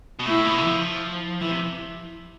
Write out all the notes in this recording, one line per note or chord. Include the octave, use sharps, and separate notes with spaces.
B2
A2 E4
B2
F3
E3 E4
C3